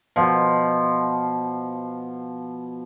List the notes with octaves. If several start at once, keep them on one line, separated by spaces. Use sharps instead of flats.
B2 F3